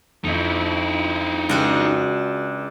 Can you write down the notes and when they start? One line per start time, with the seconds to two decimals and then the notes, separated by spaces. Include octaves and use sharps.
0.24 F2 D#4 E4
1.49 C#2 D4 F#4 G#4